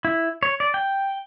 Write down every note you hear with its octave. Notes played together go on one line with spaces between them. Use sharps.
E4
C#5
D5
G5